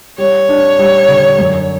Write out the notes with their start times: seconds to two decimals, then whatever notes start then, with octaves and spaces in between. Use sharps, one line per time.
0.18 G3 C#5
0.49 D4
0.79 G3
1.08 D3
1.39 F#2